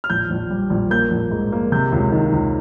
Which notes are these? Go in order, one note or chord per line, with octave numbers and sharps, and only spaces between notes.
F6
A#1 G6
A#1
G3
A#1
A#3 G6
A#1
G#2
A#3
C3 G6
C#2
D#3
C#2